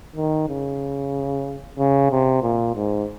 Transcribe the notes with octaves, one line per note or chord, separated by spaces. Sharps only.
D#3
C#3
C#3
C3
A#2
G#2